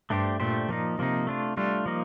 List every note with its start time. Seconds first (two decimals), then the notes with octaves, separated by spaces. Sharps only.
0.10 G2 A3 D4 G4 C5
0.40 A#2 A3 D4 G4 C5
0.69 A#2 F3 A#3 D#4
0.98 C3 F3 A#3 D#4
1.27 A3 D4 F4
1.57 G3 A3 D4 F4
1.86 F3 A#3 D#4